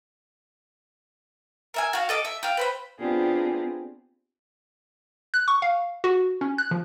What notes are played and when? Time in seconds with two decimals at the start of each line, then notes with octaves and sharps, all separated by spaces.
1.74 A#4 E5 G#5
1.93 F#4 F5
2.09 A4 D#5 D6
2.25 E5
2.43 F5 G5
2.57 B4 C5 B5
2.99 B3 C4 D4 F4 G4 G#4
5.34 F#6
5.48 C#6
5.62 F5
6.04 F#4
6.41 C#4
6.58 F#6
6.71 F3